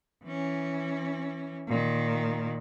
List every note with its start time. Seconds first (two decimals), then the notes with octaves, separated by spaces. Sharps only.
0.25 E3 C#4
1.68 A#2 D#3